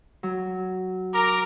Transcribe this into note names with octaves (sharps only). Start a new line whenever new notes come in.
F#3
A#4 A#5 D6